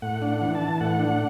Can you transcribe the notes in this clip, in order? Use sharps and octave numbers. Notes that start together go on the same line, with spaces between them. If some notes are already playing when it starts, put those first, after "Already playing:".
A2 F#5
D4
F#5
E3
A5
E3
A2 F#5
D4